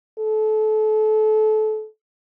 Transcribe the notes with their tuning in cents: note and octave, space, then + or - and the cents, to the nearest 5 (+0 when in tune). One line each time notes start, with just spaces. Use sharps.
A4 -30